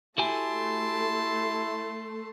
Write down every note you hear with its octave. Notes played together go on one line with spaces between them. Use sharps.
A3 E4 F#4 G4 G#5 A5 C6